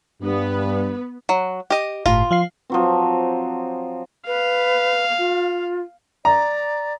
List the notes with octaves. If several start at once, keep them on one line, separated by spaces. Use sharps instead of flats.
G2 B3 B4
F#3
G4 D#5
G1 A2 F4
F3 F5 C7
F3 F#3 C4
B4 F5
F4
D5 A#5